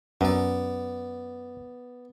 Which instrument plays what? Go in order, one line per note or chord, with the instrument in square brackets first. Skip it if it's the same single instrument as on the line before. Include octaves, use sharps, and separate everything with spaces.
[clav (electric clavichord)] F#2 [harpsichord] B3 D5